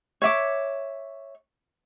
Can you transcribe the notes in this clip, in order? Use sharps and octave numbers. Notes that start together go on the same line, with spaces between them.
C#5 E5 D6